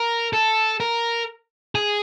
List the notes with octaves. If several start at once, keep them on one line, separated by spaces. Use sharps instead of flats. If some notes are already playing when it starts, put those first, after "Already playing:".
Already playing: A#4
A4
A#4
G#4